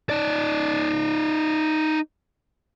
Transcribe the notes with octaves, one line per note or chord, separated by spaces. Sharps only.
D#4 D5